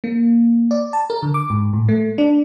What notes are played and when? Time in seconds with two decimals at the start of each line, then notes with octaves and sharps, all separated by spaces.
0.04 A#3
0.71 D5
0.93 A5
1.10 A#4
1.23 D3
1.34 D6
1.50 G#2
1.73 A2
1.88 A3
2.18 D4